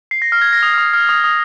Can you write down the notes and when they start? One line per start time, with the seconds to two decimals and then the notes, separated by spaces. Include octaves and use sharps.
0.11 C7
0.22 A#6
0.32 F6
0.42 G#6
0.53 A#6
0.63 D#6
0.73 F6
0.78 D#6
0.93 F6
1.09 D#6
1.24 D#6